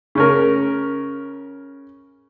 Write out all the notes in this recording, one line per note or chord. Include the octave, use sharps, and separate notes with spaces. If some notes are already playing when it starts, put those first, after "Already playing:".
C#3 C#4 A#4